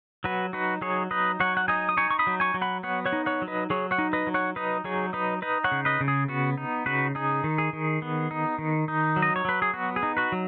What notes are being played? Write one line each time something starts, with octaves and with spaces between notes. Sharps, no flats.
F#3 F#4 B4
D#4 F#4 B4
F#3 G#4 C#5
D#4 B4 D#5
F#3 C#5 F#5
F#5
D#4 D#5 G#5
D#6
D#4 G#5 C#6
C#6
B5 D#6
F#3
G#5 C#6
F#3
F#5 B5
B3 C#5 F#5
C#5 F#5
D#4
C#5 F#5
F#3
B4 D#5
F#3 G#4 C#5
C#5 F#5
D#4
B4 D#5
F#3
C#5 F#5
D#4 B4 D#5
F#3 G#4 C#5
D#4 B4 D#5
D#4 B4 D#5
C#5 F#5
C#3
B4 D#5
C#3
G#4
B3 F#4
D#4
C#3 F#4 B4
D#4 G#4
D#3
G#4
D#3
B3
D#4
D#3
D#4
F#3
D#5
C#5
F#3 B4
G#4
B3 F#4
G#4
D#4
F#4 B4
F#3